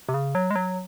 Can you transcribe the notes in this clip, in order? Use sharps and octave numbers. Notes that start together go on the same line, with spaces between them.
C3
C#3
F#3
G#3
F#3